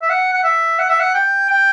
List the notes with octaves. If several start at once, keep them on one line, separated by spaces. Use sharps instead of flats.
E5
F#5
F#5
E5
F#5
E5
F#5
G5
G5